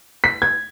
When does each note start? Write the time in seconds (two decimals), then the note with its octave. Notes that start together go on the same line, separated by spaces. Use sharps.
0.24 B6
0.42 G#6